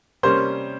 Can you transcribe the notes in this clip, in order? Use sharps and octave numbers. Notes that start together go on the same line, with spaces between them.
C3 G3 A#3 C#4 C5 C6